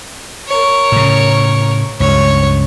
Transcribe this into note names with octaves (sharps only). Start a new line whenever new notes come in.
A#4 C#5
A2 C#3
C#2 G2 C#5